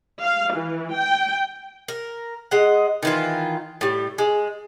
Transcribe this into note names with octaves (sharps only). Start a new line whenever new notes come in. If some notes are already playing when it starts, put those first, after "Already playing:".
F5
E3
G5
A#4
G#3 D#5 F#5
D#3 E3 F4
A2 G3
G#3